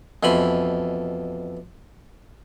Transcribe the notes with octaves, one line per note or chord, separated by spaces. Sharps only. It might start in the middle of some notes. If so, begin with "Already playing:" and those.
F2 B2 E3 B5 C6